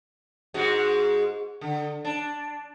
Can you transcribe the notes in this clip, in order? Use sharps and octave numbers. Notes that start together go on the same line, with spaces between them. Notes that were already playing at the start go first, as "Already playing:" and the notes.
G#2 G#3 F#4
D3
D4